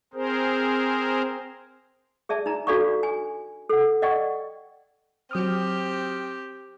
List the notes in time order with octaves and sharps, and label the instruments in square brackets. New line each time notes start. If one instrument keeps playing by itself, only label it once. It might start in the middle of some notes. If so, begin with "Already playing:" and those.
[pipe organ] C4 G#4 A#4 C5
[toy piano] G#4 D5 E5 A5
D#4 A#5
D4 F#4 A4 D5 F5 C#6
G#5
A4 F#5
D5 D#5 F#5 G5 C#6
[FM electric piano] F#3 D#6 F6 [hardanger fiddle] C4 G4